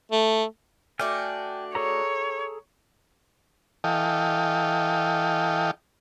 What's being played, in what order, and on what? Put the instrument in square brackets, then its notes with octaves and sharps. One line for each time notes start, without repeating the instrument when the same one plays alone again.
[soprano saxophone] A3
[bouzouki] A3 D4 F#4 [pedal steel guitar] G5 G#5 F6
[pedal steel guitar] G#4 A4 A#5 [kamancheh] C#5
[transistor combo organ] E3 A4 D#5 F5 G5